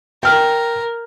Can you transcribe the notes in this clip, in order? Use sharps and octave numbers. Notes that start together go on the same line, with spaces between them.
A#4 G5 F6